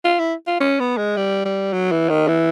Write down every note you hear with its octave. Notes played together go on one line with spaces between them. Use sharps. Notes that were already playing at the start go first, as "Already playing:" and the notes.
F4
E4
F4
C#4
B3
G#3
G3
G3
F#3
E3
D#3
E3